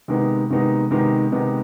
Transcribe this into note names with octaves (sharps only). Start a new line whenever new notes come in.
C3 D#3 G#3 B3 D#4
C3 D#3 G#3 B3 D#4
C3 D#3 G#3 B3 D#4
C3 D#3 G#3 B3 D#4